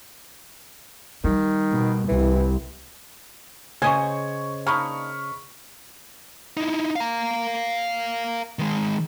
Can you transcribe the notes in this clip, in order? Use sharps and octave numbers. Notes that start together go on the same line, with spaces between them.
D#3 G3
B2
C2 E3
C#3 C#4 C5 D#5 G#5 C#6 G#6
A#3 D4 D#4 B5 C#6 F6
D#4 E4
F5 A#5
D#3 G#3